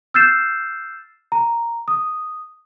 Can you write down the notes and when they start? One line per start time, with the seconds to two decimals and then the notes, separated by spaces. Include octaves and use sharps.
0.14 E6 F6 G6 A6 C7 E7
1.32 A#5
1.88 D#6